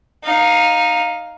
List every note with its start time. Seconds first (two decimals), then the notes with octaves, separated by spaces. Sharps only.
0.24 D#4 F5